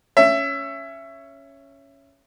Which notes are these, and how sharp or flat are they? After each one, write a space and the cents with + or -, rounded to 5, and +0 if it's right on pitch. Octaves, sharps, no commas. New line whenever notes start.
C#4 +0 E5 +20